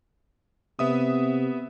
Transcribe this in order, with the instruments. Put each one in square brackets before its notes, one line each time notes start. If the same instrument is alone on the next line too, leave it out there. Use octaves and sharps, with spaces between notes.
[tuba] C3 [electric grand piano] B3 E5 D#6